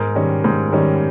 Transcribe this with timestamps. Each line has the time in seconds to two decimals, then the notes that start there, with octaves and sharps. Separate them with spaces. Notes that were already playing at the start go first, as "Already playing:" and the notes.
Already playing: G#2 A#4
0.15 D#3 G3 C#4
0.44 G#2
0.72 D#3 G3 C#4